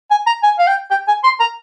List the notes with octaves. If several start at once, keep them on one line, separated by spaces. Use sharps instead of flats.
G#5
A#5
G#5
F5
G5
G5
G#5
C6
A#5